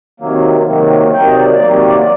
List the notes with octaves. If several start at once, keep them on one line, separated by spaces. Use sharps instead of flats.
C3 D#3 F#3 A#3
C3 D#3 F#3 A#3
C3 D#3 F#3 A#3 G5
D#5
D5
C3 D#3 F#3 A#3